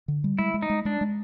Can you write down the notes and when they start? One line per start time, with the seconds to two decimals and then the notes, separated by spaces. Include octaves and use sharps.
0.08 D3
0.24 G3
0.39 G#3 E4
0.54 G#3
0.62 D#4
0.70 G#3
0.85 G#3 D4
1.01 G#3